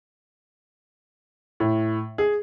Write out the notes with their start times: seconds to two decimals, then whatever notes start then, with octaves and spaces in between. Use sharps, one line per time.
1.60 A2
2.18 G#4